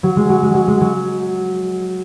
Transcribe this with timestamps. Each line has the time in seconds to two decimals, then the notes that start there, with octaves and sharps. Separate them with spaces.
0.03 F#3
0.16 G#3
0.29 F#3
0.43 G#3
0.54 F#3
0.68 G#3
0.81 F#3